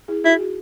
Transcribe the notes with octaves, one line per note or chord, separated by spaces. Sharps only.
E4 G#4
D#4 E4 F#4
G#4
D#4 F#4